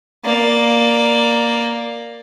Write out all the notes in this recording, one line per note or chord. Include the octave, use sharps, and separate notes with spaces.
A#3 D5